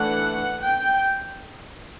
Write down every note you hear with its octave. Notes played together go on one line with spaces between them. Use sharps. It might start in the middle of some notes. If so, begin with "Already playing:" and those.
Already playing: E3 A3 D4 F#5
G5